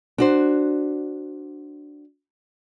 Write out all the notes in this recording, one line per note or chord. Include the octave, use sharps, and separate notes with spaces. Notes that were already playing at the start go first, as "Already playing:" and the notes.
D4 F#4 C5